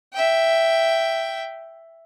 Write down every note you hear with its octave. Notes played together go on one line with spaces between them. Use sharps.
E5 G5